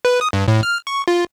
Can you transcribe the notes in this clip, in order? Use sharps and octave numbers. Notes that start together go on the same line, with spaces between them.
B4
D#6
G2
A2
F6
C#6
F4